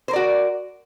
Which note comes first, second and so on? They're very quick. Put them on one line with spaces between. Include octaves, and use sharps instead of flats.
C5 A#4 D5 F#4